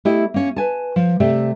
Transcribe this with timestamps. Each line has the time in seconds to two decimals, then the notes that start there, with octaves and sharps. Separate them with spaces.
0.05 A3 E4 G4 D#5
0.34 A#3 C#4
0.56 B4 G#5 A5
0.96 F3
1.20 C3 A3 G4 D5 E5